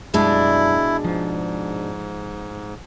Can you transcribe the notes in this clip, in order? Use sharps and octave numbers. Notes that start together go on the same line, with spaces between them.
F#2 B2 G3 G#3 D4 E4
G#2 F3